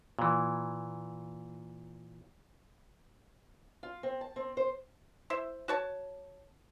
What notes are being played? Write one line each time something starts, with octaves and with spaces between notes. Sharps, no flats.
A#2 E3
F4
C4
A5
C4
C5
E4 C5 E5
F#4 C#5 A5